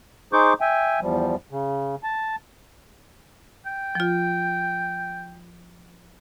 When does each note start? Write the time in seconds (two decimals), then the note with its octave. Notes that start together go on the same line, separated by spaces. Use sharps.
0.33 D#4 G#4 C5 C#6 D6 G6
0.61 E5 G5 G#5
1.01 E2 F3 G3
1.51 C#3
2.04 A5
3.66 G5
3.95 F3 F4